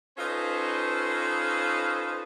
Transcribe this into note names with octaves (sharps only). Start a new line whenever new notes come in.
C#4 D#4 F4 A4 B4 C5